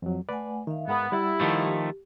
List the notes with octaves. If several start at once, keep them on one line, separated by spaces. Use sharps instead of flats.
F2 F#3
A3 B4 D5 F#5 G#5
D#3 E5 F5
G#2 G#3 B3 A#4
G3 E4 G4 F#5 A6
D#3 F3 A3